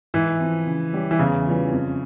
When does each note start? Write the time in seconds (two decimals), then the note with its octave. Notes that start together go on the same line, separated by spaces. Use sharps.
0.14 G#2 E3
0.40 F3 C4
0.67 C#3
0.93 G3 C#4 G4
1.11 E3
1.19 E2 C#3
1.46 E3 G3 C#4 F4
1.72 F2